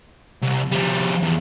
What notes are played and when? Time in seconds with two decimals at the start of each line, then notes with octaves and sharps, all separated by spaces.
0.42 C2
0.71 F3 G3
1.23 E2